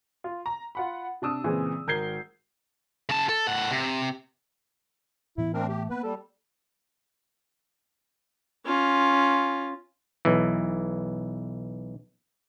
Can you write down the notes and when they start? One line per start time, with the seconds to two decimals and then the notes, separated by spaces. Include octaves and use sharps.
0.24 F4
0.46 A#5
0.75 F4 F#5 B5
1.22 C3 D4 D#6 E6
1.44 A#2 C#3 E3 G#3 C4 G#4
1.87 G#1 A#4 G6 G#6 C7 G7
3.09 C#3 A5
3.29 A4
3.47 A2 F#5
3.71 C3
5.38 A2 E3 B3 E4
5.54 A3 C4 D4 A#4
5.69 G4
5.90 A#3 B3 B4
6.03 G3 A4
8.66 C#4 F4
10.25 B1 E3